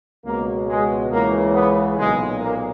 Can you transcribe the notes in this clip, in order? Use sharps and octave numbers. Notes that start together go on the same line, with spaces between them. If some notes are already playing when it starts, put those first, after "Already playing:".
C#2 B2 A#3
G#3
C#2 C#3 E3 A#3
B3
B1 A#2 G#3
A#3